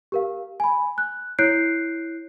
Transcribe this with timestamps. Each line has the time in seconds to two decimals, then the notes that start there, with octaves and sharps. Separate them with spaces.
0.12 G4 A#4 F5
0.60 G#5 B5
0.98 F#6
1.39 E4 C#5 F#6 G6 C7 D7